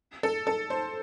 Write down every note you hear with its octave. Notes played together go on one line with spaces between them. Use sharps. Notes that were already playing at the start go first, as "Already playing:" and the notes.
A4
A4
C5